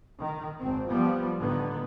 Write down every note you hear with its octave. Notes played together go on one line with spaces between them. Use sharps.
D#3
G#1 C4
F3 G3 B3
A2 D3 D#3 B3